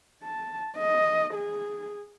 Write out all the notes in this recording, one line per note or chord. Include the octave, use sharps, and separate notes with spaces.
A5
D#5
G#4